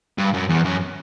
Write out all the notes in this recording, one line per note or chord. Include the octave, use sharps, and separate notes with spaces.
G2
F#2
E2
F#2